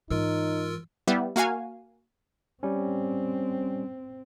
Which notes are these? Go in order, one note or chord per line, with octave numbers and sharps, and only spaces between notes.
G#2 E3 D#4 F4 A#4 E6
G3 B3 E4
A#3 F#4 F5 G#5
G3 C4 C#4